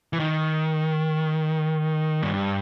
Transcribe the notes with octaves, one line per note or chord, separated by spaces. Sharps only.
E3
D#3
G2